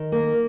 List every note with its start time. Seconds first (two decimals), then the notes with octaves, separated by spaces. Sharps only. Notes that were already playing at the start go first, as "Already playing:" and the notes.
Already playing: D#3
0.12 A#3